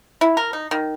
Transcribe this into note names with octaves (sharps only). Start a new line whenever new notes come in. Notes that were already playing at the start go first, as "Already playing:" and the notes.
E4
A#4
D#4
D#3